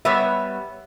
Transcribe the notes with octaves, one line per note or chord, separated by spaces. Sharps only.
G3 B3 C#5 E5